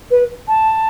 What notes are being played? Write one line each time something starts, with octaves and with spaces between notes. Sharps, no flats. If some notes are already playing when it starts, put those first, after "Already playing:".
B4
A5